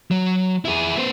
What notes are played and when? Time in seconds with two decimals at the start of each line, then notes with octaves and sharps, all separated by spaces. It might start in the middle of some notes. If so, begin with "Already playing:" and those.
0.11 F#3
0.65 E4 G#4
0.97 B3 C5